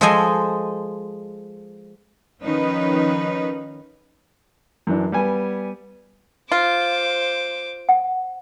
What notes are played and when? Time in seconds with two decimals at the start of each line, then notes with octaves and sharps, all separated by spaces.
0.01 F3 G#3 A4 C5 D#5 G#5
2.43 D#3 F3 C#4 D#4 B4
4.87 F#2 E3 D4
5.12 G3 B3 G#5
6.52 F4 C5 D6
7.89 F#5